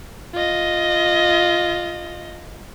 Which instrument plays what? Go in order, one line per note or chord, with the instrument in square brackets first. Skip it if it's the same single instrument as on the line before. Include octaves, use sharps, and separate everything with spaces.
[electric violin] F4 D#5